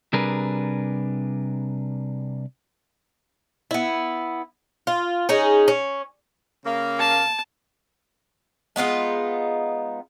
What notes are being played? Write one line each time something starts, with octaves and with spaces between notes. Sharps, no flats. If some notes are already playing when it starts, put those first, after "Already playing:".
C3 G3 D4 G#4 A#4 B4
B3 E4
F4
C#4 D#4 G#4
C#4
C#3 A#3
A5
G#3 B3 D#4 F4